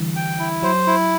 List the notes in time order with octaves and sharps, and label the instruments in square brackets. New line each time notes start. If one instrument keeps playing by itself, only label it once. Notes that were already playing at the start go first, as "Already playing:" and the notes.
Already playing: [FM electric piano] D3 E3 G3
[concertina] G5
E4
[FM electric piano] F#3 [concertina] C5
[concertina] E4